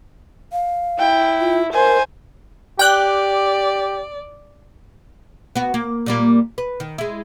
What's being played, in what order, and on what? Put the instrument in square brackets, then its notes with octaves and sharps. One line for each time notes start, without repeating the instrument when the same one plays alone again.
[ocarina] F5
[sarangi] E4 [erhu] G5
[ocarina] F4
[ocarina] A#4 [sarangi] C5 [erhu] G#5
[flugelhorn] G4 [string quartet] D5 [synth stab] G5 F#6
[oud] B3 F#4
A#3
A#2 G3 A#3
B4
D#3
G#3 E4